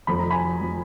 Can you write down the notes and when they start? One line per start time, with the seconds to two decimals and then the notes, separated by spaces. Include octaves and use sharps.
0.07 F1 F2 F3 B5
0.19 A#5
0.31 G#5 B5
0.61 F3